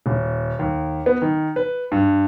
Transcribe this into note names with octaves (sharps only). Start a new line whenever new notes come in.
D#1
D#2
B3
D#3
B4
G2